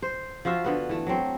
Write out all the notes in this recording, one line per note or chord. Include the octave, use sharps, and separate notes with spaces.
C5
F3 F4 F#4 E5
D3 B3 B4
E3 A3
F#3 C4